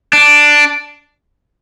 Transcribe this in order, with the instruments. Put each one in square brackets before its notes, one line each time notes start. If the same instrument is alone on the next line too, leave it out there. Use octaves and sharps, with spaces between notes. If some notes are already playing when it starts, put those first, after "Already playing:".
[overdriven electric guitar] D4